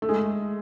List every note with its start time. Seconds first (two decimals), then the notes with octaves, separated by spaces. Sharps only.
0.02 A3
0.09 G#3